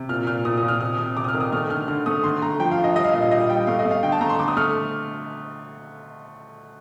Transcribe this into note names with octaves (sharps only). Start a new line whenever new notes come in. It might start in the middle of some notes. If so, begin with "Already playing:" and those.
Already playing: C3
A#2 F6
A#2 F6
A#2 D#6
D#6
A#2
F6
C3 D#6
C3 D#6
C3 D6
D#6
F6
D#3
D#6
A3 F6
D3 F6
D3 F6
A3 D#6
D3 C6
A3 A#5
F3 G5
F5
D3
D#5
G3 D#5
F5
A#2 D#5
F5
G3 D#5
G3 G5
A3 F5
D#5
A3
F5
D3 G5
A5
A3 A#5
C6
D3 D6
D#6
A3 F6